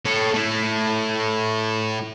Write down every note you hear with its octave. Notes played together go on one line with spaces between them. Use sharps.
A4 C#5
A3 E4